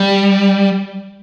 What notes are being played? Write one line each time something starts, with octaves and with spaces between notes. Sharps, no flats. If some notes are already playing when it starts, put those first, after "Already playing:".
Already playing: G3